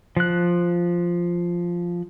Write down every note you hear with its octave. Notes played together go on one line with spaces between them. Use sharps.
F3 F#6